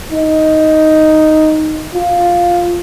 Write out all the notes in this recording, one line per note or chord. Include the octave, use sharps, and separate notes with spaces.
D#4
F4